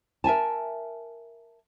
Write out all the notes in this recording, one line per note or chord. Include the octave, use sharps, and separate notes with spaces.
A#4 E5 G#5 A5